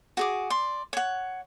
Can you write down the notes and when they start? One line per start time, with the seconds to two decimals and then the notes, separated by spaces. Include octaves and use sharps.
0.17 F#4 G#4 D6
0.50 D5 C6
0.93 C#5 F#5